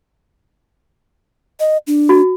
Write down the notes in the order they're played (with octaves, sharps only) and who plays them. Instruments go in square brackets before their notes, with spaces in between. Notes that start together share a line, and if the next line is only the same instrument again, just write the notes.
[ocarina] D#5
D4
[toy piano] F#4